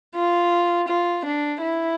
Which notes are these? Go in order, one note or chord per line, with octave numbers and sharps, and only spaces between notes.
F4
F4
D4
E4